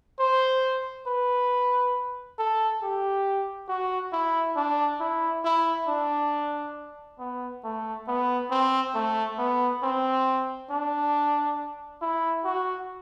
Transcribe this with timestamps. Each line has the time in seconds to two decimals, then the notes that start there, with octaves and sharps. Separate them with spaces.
0.19 C5
1.06 B4
2.38 A4
2.82 G4
3.68 F#4
4.12 E4
4.56 D4
5.00 E4
5.44 E4
5.87 D4
7.19 B3
7.64 A3
8.07 B3
8.50 C4
8.94 A3
9.38 B3
9.83 C4
10.70 D4
12.01 E4
12.44 F#4